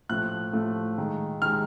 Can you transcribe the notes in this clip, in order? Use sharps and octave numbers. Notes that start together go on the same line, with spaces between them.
A2 F3 A3 F#6
A2 F3 A3
D#3 G#3
D#3 G#3 F6